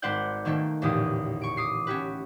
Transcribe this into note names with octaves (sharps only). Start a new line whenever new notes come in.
G#1 B4 C5 D5 F#5 G6
B2 D#3 A3 A#3 A4
A1 E2 A#2 D3 G4 D#6
C#6 D7
D6 D#6 C7
C#4 F#4 G4 B4